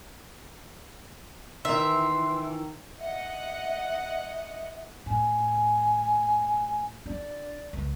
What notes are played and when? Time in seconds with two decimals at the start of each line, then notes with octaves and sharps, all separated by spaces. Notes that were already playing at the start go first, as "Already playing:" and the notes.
1.65 D#3 E3 E5 C6
3.00 D#5 E5 F#5
5.06 A2 G#5
7.06 D4 D5
7.73 C#2